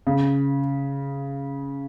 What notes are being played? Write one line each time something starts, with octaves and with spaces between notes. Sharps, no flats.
C#3